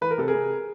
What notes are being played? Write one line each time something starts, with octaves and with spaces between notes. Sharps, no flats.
E3 B4
A#4
C3 A4
G#4 A#4
C3